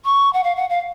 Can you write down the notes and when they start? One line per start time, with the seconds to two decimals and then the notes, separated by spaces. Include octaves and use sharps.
0.04 C#6
0.33 F#5
0.43 F5
0.56 F#5
0.70 F5